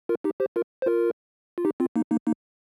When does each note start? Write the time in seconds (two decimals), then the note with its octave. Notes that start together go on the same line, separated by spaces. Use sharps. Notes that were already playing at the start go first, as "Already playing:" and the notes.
0.09 F4 A#4
0.24 D#4 G4
0.40 G4 C5
0.56 F4 A#4
0.82 C5
0.86 F4 A#4
1.58 F4
1.65 D#4 G4
1.80 C4 F4
1.96 A#3 D#4
2.11 A#3 D#4
2.27 A#3 D#4